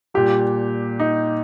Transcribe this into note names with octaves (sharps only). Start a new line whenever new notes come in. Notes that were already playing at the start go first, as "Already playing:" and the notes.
A#2 G3 G4
D#4